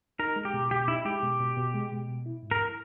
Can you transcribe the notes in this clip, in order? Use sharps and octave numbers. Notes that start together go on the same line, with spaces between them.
D#4 A#4
G#3
G4
B2
B2 G4
D#4 E4
G#3 G4
B2
B2
B2
G#3
B2
B2
E4
G#2
A#4